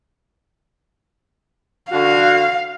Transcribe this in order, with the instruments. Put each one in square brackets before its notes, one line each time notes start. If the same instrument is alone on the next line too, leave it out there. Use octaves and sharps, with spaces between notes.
[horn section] D3 F#4 [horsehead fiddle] F5